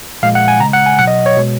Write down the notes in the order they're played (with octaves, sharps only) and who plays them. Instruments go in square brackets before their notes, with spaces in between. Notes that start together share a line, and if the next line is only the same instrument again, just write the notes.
[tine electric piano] A#2 F3 G#3 F5
F#5
G#5
C#3 G#3 A#5
F#5
G#5
B2 F#3 F#5
D#5
C#5
B2 G#3